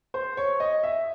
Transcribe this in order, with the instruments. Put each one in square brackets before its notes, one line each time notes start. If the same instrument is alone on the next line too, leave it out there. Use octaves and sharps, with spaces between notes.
[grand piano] C5
C#5
D#5
E5